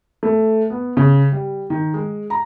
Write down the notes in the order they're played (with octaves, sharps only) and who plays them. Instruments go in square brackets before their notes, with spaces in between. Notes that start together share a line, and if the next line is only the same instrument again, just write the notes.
[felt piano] A3
B3
C#3
G3
D#3
G#3
A#5